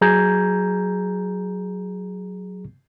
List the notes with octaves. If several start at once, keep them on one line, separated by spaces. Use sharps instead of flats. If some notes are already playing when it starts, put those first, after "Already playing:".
F#3 G#4 A#5 G6 G#6